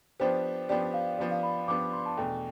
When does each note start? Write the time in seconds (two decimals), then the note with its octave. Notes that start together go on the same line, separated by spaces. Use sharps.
0.20 F3 B3 D4 G4 C5
0.69 F3 B3 D4 G4 D5
0.94 F5
1.18 F3 B3 D4 G4 D5
1.31 F5
1.43 B5
1.68 F3 B3 D4 G4 D6
1.93 C6
2.06 A5
2.17 E2 B2 A3 D4 G5